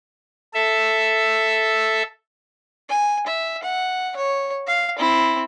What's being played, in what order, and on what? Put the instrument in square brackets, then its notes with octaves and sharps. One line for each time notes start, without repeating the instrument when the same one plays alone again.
[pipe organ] A4 E5
[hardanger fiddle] G#5
E5
F#5
C#5
F5
C4 E4